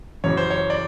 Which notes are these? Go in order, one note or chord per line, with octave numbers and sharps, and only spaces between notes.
F#2 C#3 E3 C#5
C5
C#5
D5